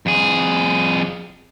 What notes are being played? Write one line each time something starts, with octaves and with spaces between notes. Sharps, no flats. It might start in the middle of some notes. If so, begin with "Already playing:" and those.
F2 G#4